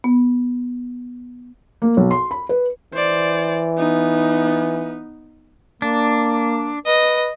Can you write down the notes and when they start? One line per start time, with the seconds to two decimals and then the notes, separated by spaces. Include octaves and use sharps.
0.04 B3
1.82 A#3
1.97 B1
2.11 C6
2.31 B5
2.49 B4
2.94 E3 C5 D5
3.78 B3 D#4
5.82 A#3 D4
6.86 B4 D#5